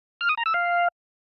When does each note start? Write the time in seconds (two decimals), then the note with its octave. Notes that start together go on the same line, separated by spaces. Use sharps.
0.21 F6
0.29 D#6
0.38 A#5
0.46 E6
0.54 F5